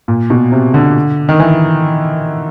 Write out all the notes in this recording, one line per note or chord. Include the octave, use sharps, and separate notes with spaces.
A#2
B2
C3
D3
D#3
E3